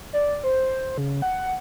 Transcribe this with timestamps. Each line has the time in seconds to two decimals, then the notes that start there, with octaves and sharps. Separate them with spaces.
0.13 D5
0.44 C5
0.98 C#3
1.22 F#5